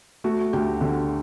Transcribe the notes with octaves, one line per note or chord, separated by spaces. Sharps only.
A3 F#4
D2 G4
D3